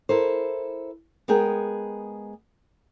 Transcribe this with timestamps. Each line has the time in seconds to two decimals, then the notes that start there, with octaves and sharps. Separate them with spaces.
0.09 E4 A4 A#4 C5
1.28 G#3 B3 G#4 A#4 G5